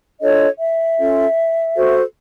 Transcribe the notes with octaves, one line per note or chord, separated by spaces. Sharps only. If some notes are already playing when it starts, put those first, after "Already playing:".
D4 F4 A4 C#5 D#5
E5
C#4 F4 A4
F#4 A4 C5